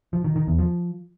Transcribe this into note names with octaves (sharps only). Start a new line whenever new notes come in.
F3
D#3
D#3
E2
F3